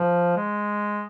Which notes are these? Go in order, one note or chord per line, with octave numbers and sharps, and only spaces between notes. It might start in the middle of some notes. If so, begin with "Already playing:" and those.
Already playing: F3
G#3